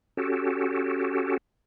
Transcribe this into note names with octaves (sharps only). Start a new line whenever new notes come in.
C#4 F#4 G4 A4